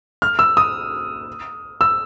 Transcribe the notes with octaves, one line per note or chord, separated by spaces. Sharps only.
F6
E6
D#6
E6